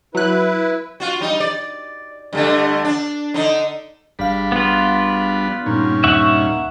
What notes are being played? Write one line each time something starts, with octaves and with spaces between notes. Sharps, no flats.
F#3 E4 B4 F#6
F4 F#4
G3 D#4
D5
G2 D3 A3
D4
D3 D#4
G#1 G3 D4 F5 B5
B3 F4
G2 A#2 C#4 D#4
D#2 E5 F#5 C#6